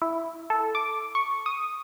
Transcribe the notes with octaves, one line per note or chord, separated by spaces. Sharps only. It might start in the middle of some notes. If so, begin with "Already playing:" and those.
E4
A4
D6
C#6
D#6